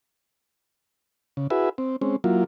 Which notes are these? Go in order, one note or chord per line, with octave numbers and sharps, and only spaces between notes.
C#3
E4 F#4 G#4 B4 E5
C4
G#3 C4 C#4
F#3 A#3 E4 F4